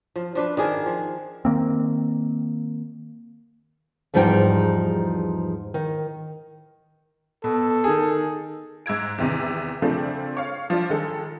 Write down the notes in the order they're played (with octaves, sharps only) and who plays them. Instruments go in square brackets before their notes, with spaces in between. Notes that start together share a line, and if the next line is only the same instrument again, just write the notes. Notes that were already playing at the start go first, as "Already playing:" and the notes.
[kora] F3
F3 D4 B4
D#3 D4 G#4 A#4
F3
[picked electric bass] D#3 A#3 C4
[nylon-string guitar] E2 G#2 F3 G3 D#4 G5
D#3
[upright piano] B2 [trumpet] A4
[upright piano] D#3 G#4
[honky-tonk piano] G#2 E6 G#6 D7
E2 C3 D#3
C#3 F3 A3 C4 D4
C#5 F5
F3 D4 F4
D#3 G#3 A4